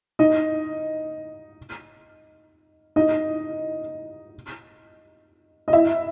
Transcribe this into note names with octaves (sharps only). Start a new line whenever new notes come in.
D#4 D#5
D#4 D#5
D#5
E4 E5